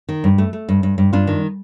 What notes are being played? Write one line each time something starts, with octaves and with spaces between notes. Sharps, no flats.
D#3
G2
A3
A3
G2
G2
G2
G2 D4 F4
D#3